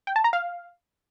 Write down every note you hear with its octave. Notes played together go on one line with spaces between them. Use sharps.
G5
A5
A#5
F5